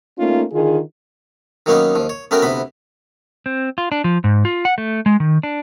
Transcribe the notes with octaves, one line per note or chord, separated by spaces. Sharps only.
A3 A#3 C#4 D#4 F4
D3 D#3 F4 G#4
D#3 F#3 A#3 B3 C#4 D#4
D#2 F3
C#5
A3 B3 C#4 F#4 A#4 G5
D2 C3 B3 B5
C4
F4
D4
F3
G#2
F4
F#5
A3
G#3
D#3
D4